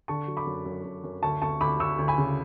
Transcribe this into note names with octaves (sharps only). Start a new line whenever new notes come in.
D3 A5 C#6
F#3
B5 D6
F#2
F#2
F#2
F#2
D2 A5 C#6
D2 A5 C#6
D2 B5 D6
D2 C#6 E6
D2
G#5 B5
C#3